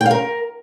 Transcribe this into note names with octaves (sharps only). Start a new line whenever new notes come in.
G5
F5
A#4